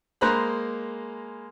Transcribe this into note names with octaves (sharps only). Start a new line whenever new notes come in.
G#3 A#3 C5 A#5 B5 F#6